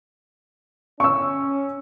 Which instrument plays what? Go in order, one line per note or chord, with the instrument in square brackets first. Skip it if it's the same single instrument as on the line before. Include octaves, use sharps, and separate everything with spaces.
[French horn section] C#4 [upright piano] C#6 E6